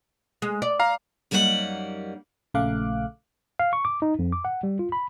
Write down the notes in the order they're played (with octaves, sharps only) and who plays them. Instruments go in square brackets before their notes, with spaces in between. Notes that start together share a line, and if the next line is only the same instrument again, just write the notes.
[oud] G#3
D5
[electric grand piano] F5 A#5
[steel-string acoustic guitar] F#2 G3 A#3 D#4 E4 F#5
[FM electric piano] A#1 C#3 A3 F5 D6 F#6
[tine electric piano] F5
C#6
D6
D#4
F2
D6
F#5
G3
F4
B5